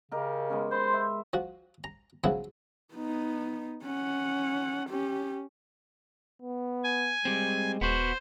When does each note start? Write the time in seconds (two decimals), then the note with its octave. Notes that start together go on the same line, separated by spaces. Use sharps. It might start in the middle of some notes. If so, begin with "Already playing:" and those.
0.12 C#3 G4 A#4 D#5
0.50 G#3 B3 C#4
0.71 C5 B5 C6
0.94 E5
1.33 F3 F#4
1.84 A#5
2.24 C#3 F3 F#3 B3 E4 F#4
2.94 B3 D#4
3.84 C#4 F#5
4.90 C#4 G4
6.42 B3
6.84 G#5
7.25 G3 G#3 C4
7.81 D#1 B3 F#4 C5